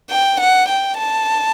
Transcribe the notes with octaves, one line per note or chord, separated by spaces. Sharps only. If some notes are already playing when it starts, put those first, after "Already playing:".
G5
F#5
G5
A5